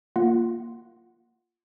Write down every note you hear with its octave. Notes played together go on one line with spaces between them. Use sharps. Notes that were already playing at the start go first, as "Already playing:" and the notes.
A#3 F4 F#5 C6